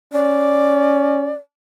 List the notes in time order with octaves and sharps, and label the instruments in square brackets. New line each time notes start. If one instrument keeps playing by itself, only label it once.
[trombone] C#4 [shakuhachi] D5